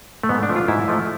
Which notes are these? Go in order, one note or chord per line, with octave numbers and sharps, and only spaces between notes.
A3
G#2 B3
D4
F3 A3
F4
G#2 E4
F3 A3